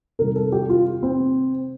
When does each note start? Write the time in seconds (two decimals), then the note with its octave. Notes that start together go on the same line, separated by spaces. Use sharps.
0.19 C3 D#3 G3 A#4
0.36 A4
0.52 G4
0.69 F4
1.03 C4